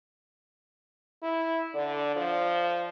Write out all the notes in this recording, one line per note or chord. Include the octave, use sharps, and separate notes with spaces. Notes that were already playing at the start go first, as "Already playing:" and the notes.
E4
D3 D5
F3